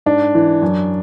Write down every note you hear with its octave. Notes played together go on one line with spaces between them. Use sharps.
G#2 D4
E3
F#2